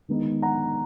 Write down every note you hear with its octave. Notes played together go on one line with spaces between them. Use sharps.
D#3 G#3 B3 D#4
F#5 A#5